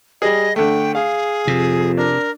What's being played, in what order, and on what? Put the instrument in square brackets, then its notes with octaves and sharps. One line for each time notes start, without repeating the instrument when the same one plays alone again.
[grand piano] G3 G#4 [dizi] D#5
[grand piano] D3 A3 [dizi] G5
[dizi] G#4 [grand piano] F5
[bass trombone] F2 [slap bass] C3
[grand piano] D4 [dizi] A#4